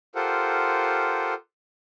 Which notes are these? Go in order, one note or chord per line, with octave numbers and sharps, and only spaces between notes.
F4 G4 A4 A#4 C5 F#5